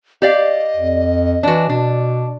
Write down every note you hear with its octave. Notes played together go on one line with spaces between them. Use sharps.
G4 D5 D#5 F5
F2
E3 D4 F#4
B2 D4